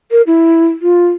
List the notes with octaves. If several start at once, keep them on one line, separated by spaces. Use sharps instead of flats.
A#4
E4
F4